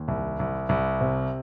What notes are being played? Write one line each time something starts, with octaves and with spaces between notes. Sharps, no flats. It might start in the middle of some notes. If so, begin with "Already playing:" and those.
Already playing: D#2
C2
C2
C2
C3